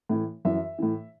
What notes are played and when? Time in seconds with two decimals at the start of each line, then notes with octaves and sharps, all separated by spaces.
0.09 A2 E3
0.45 F#2 E3 E5
0.79 A2 E3